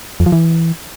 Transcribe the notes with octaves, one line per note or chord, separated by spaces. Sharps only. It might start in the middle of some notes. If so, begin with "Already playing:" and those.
F2
F3
E3